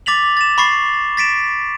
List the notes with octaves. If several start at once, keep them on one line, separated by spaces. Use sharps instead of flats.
D6 A6 B6 F7 F#7
A6 E7
B5 C#6 A6 C7
A6 B6 D7 E7